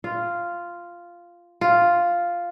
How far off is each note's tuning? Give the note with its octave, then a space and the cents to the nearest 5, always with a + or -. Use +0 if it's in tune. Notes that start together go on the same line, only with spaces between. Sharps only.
F4 -5
F4 +0